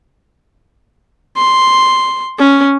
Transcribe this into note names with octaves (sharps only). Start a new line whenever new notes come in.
C6
C#4